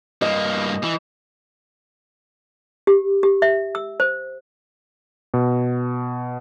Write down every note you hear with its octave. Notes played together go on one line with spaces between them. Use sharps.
G2 A#3 D#5
E3
G4
G4
E5
E6
C5
B2